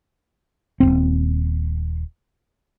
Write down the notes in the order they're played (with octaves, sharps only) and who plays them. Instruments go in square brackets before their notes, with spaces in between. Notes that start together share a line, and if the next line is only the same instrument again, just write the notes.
[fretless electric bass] D#1 G#1 C4